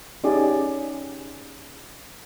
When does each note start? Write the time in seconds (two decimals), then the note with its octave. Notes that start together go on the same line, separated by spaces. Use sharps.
0.24 C#4 D#4 G4 G#4 D5